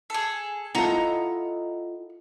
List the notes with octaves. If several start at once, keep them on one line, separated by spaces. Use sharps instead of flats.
G#4 A4
E4 F4 A4 D#5 F#5 A#5